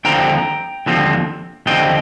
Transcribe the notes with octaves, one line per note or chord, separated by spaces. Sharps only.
D#2 D3 F3 C4 G5 A#5
D#2 D3 F3 C4
D#2 D3 F3 C4 D#5 G5